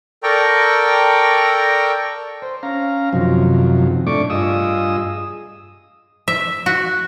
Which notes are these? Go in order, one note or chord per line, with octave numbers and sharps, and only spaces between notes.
A4 A#4 D5 G5 A#5 C#6
C5
C#4 F5 A#5
F#2 C3 D#3 F3 F#3
A2 A3 D4 D5 C#6 D6
G2 F4 G#4 D#5 D#6 E6
E5
F#4